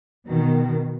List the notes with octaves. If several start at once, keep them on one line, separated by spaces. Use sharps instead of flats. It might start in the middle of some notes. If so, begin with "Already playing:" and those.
B2 D#3